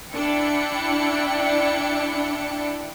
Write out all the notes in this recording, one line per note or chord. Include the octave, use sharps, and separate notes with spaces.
D4 E4 G5 C#7